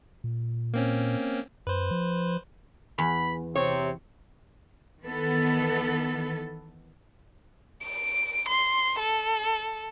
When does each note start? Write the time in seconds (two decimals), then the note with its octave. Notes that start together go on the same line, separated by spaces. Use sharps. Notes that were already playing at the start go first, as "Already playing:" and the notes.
0.24 A#2
0.74 A#3 C4 C#4
1.67 F#2 B4 C5
1.91 F3
2.98 E2 B5
3.55 C3 C4 C#5
5.03 D#3 E3 B3 A4
7.83 D7
8.48 C6
8.99 A4